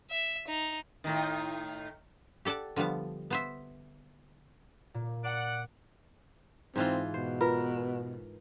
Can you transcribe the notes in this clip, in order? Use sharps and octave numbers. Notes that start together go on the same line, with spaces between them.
E5
D#4
A2 D#3
G4 A4 D5 F#5 A5
D3 F3 G3 B3 A5
B3 C5 E5
A#2
D5 F#5
G#2 E3 C4 F4
B2 C5
F4 A#4 B4